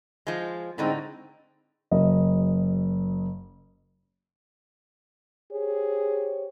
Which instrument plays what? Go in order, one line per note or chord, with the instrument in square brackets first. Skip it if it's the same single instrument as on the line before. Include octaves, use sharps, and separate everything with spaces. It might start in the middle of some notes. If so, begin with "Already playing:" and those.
[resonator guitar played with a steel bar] F3 G#3
[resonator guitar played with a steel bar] A2 D3 D#4 [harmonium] G#3 C4
[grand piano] F#1 D#5
[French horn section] G4 C5 C#5 [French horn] G#4